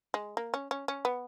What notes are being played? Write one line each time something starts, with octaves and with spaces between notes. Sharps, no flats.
G#3
A#3
C#4
C#4
C#4
B3